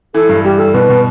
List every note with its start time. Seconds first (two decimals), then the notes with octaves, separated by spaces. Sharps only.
0.14 E3 A4
0.29 G2
0.44 G3 G4
0.59 G3 A4
0.74 B2 B4
0.89 B2